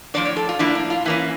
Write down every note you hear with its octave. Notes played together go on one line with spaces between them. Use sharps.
A2 F3 A#3 D4 D5
C#5
A4
F4
A2 F3 A#3 D4 E4
D4
F4
E3 A#3 C#4 E4